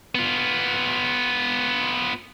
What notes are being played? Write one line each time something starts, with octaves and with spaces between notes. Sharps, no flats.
B3 F4